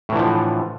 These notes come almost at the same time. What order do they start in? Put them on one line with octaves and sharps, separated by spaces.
A2 E3 D3 F3